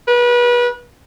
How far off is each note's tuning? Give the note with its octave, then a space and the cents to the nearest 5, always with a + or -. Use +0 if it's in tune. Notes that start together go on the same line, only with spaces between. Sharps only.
B4 -30